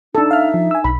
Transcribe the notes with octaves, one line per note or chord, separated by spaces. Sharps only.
D4 D#4 A4
E5 F5 F6
F3
G#5 E6
B1 B5